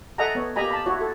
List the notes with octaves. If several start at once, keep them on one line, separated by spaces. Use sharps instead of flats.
A4 D#5 E5 F#5 G#5 A#5
B3 C#5
A#3 G4 D#5 G#5 A#5 B5
A5 B5
E4 F#4 C#5
A4